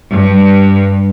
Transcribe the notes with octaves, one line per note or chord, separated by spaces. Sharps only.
G2